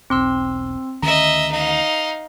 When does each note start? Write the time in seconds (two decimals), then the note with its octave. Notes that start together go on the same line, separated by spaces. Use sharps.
0.10 E1 B1 C4 C6 E6
1.02 D2 D#3 C#4 D#5 E5 A#5
1.52 D#4 F5